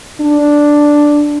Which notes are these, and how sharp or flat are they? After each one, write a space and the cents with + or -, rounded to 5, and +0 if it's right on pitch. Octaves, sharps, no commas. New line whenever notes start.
D4 +0